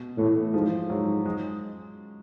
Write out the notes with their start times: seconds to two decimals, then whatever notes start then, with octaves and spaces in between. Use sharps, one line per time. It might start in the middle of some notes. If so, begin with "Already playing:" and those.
Already playing: B2
0.18 A2 E3
0.54 G#2 F3
0.90 G#2 F#3
1.26 G#3